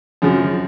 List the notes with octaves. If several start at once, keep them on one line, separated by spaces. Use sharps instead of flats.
F#2 C#3 F3